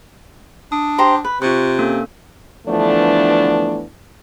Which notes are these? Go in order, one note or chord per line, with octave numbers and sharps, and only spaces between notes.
D4 D#6
G4 C5 A#5
B4
C3 F4 C#6 F#6
A#3 C#4 A4
D3 E3 F3 A3 B3 D4